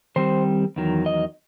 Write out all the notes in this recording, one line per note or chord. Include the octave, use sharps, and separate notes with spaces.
D#3 G3 C4 C5
E2 D#3 F#3
D#5